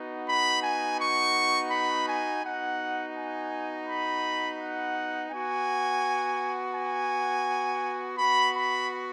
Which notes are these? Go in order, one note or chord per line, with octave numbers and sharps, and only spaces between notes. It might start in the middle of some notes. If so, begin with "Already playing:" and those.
Already playing: B3 D#4 F#4
B5
G#5
C#6
B5
G#5
B3 D#4 F#4 F#5
G#5
B5
F#5
B3 F#4 G#5
G#5
B3 F#4 B5
B5